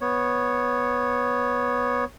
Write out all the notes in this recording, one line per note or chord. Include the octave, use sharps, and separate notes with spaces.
B3 C#5